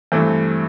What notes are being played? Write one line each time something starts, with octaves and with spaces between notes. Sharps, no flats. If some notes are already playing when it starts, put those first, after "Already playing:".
G2 E3 A3 C4